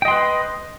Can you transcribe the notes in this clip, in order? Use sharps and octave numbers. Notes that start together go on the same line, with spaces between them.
B4 D#5 G5 C6